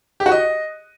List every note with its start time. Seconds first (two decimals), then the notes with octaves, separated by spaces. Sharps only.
0.20 G4
0.26 F#4
0.32 D#5